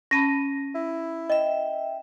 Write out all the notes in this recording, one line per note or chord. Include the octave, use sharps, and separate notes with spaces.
C#4 A5 B5 A#6 D#7
E4
D#5 E5 G5